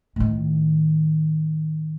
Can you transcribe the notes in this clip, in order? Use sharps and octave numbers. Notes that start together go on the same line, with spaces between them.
A2 D#3